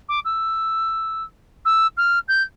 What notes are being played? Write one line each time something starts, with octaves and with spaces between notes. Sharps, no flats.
D6
E6
E6
F6
G6